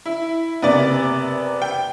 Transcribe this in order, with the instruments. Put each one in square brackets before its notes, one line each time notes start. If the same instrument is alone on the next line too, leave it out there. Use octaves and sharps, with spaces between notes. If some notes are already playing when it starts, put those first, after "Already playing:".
[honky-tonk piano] E4
[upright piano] F#1 C3 [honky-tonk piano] B3 D5
[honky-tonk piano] G5